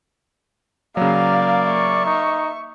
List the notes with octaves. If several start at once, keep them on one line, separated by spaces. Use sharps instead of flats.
C#3 F#3 A#3 D5 F5
E5 C#6
D#4